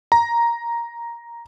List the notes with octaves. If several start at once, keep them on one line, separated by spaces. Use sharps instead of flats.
A#5